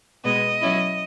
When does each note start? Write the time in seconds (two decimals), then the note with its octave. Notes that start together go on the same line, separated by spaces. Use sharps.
0.24 B2 G#3 B3 D#5
0.61 F#3 C#4 E4